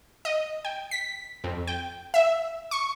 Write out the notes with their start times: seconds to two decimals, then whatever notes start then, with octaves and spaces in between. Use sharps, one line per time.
0.25 D#5
0.65 G5
0.91 B6
1.44 F2
1.67 G5
2.14 E5
2.71 C#6